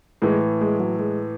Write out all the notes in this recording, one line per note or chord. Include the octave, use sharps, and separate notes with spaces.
A2 E3 G#3
G#3
F#3
G#3